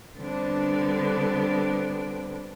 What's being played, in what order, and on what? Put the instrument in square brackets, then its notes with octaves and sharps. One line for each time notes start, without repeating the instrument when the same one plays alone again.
[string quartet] D3 G3 B3 C4 D4